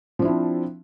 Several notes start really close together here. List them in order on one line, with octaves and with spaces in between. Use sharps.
F3 D4 E4 C4